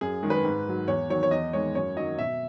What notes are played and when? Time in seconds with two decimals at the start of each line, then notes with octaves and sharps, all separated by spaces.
0.01 F#2 G#4
0.23 D#3 G#3
0.30 B4
0.44 G#2
0.66 D#3 F#3
0.88 E2 C#5
1.10 D#3 F#3 C#5
1.23 C#5
1.31 E2 D#5
1.53 D#3 G#3 C#5
1.75 F#2 C#5
1.96 D#3 F#3 D#5
2.19 B2 E5